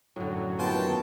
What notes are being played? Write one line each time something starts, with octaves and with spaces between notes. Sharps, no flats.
F#2 A2 D3 F#3
D#2 B3 F4 G5 A5